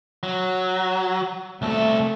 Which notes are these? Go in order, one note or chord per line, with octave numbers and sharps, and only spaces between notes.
F#3
C2 A3 A4